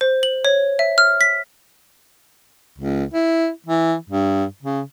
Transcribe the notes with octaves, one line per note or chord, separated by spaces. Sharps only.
C5
F#7
C#5
E5
F6
B6
C#2
E4
E3
G2
C#3